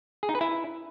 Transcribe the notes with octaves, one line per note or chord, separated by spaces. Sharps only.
G#4
D#4
B4
E4